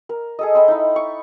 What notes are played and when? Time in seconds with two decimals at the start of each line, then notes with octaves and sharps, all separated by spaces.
0.09 A#4
0.39 G#4 A4 D#5
0.55 C5 D#5 G5 B5
0.68 D#4 E4
0.96 C#6